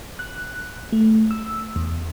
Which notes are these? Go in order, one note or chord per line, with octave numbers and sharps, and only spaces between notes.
F#6
A3
E6
E2